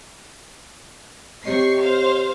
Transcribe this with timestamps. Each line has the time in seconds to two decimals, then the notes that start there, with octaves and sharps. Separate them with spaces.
1.45 C3 G4 C#5 D#5 C#6 C7
1.80 C5 F5